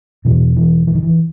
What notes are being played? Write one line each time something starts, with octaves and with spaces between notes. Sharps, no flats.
E2 B2 E3
E3
E3
D#3
E3